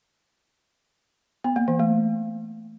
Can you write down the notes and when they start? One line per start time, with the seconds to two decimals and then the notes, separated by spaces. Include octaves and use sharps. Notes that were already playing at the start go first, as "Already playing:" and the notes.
1.44 B3
1.56 A#3
1.68 E3
1.79 A3